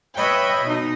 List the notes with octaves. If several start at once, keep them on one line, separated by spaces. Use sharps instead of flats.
B4 C#5 D#5 E5 G5 B5
B2 D#4